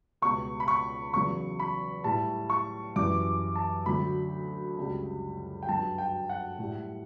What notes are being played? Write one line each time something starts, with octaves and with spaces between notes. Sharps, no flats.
C#2 B2 G3 C#6
B5
C#6
E2 C#3 F#3 C#6
B5
A2 G3 A5
C#6
F#2 E3 G3 D6
A5
D2 D3 F#3 B5
C#2 C#3 G3
G5
G2 F#3 A5
G5
F#5
A2 G3